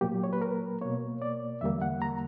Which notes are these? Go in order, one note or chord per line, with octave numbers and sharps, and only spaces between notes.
A#2 F#3 A#3 G4
C#5
B4
A#4
B2 A#3 C#5
D5
E2 D3 G3 A#3 E5
F#5
A#5